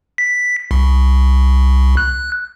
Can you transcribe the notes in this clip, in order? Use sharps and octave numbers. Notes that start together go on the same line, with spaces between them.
B6
C2
F#6